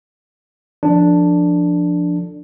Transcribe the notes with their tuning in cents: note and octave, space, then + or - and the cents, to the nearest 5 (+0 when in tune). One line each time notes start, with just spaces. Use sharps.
F3 +0 D4 +0 A4 +20